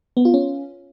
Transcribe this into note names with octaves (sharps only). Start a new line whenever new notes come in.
B3
F4
C#4